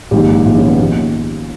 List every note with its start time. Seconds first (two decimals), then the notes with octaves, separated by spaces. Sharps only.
0.11 A#1 G#2 D#3 G4
0.45 A#1 G#2 D#3 E4
0.57 C#4
0.68 B3
0.79 D#2 D#3